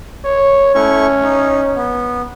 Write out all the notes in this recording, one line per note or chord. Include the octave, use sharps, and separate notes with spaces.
C#5
A3 C#4 E4 C#6
D#4
B3